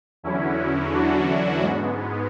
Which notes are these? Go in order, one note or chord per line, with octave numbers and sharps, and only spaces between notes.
E2 D3 F#3 C#4 E4
D4 F#4
G#2 G#3 B3